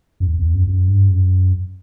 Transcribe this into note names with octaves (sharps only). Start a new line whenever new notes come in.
F#2
E2
E2
F#2
F#2
G2
F#2